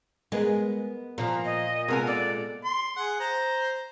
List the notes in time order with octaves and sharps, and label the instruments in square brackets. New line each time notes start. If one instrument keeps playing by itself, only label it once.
[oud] G#3 [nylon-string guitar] B3 A#4 B4
[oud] A#2 [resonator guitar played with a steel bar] F3 A#3
[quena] D#5
[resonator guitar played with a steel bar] C3 B3 G#5 [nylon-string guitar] G#3 [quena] A#4
[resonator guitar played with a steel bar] A4 [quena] D5
[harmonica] C6
G#4 F#5
C5 A#5